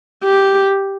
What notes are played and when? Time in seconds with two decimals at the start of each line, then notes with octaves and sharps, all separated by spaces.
0.24 G4